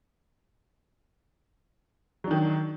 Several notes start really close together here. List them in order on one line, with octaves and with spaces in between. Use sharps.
F#3 D4 D#3